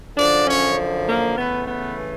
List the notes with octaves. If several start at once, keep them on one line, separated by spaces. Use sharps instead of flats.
F#2 D3 F3 D4 D5
C#4 C#5
A#3 A#4
C#3 E3 A3 B3 B4
B3 B4